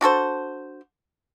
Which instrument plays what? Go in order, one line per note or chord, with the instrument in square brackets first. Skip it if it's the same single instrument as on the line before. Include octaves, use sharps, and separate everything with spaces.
[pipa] D4 F#4 A4 C5